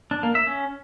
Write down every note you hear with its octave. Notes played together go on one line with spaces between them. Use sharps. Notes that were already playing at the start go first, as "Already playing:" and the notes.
D4
A#3
E5
C#4